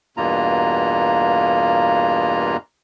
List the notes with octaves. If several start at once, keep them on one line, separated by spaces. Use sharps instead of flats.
E2 G2 B2 A#3 F4 A#5